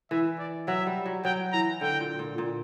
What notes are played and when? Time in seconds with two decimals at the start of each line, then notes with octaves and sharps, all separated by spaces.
0.11 E3 E5
0.39 D5
0.68 F#3 E5
0.87 G3
1.06 F#3
1.25 F#3 G5
1.53 E3 A#5
1.81 D3 G5
2.00 A#2
2.19 A#2
2.38 A#2